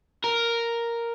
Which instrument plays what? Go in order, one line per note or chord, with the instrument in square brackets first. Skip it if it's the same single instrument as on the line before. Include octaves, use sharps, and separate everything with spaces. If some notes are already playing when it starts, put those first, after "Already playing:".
[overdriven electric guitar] A#4